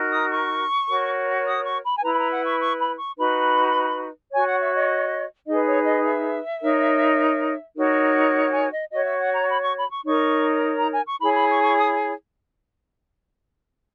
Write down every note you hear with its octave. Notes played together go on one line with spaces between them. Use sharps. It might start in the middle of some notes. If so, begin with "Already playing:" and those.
Already playing: D#4 F#4 A#4
D#6
C#6
F#4 A#4 C#5
D#6
C#6
B5
G#5
E4 B4 A#5
B5
A#5
F#5
C#6
C#6
B5
C#6
D#4 F#4 B4 B5
F#4 C#5 G#5
F#5
E5
D#5
D#4 G#4 B4 D#5
C#5
D#5
E5
D#4 A#4 C#5
D#4 F#4 A#4 C#5
F#5
G#5
D#5
F#4 C#5 D#5
E5
F#5
A#5
B5
C#6
B5
C#6
D#4 A#4 C#5 C#6
A#5
G#5
C#6
E4 G#4 C#5 B5
B5
C#6
C#6
D#6